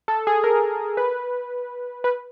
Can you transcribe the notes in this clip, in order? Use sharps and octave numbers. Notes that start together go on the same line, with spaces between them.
A4
G#4
A#4
B4
B4